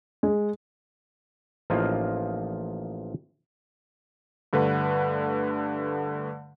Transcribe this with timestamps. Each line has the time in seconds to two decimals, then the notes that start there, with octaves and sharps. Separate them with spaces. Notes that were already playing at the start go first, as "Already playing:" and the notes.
0.23 G#3
1.70 A1 F3 A#3 D#4 F4
4.53 G2 D3 A3 B4 F#5